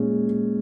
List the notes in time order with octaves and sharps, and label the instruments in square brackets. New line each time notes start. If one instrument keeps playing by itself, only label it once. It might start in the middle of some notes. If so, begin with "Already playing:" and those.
Already playing: [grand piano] A#2 G#3 C#4